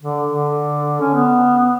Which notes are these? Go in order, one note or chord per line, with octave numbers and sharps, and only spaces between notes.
D3
D3
C#4
B3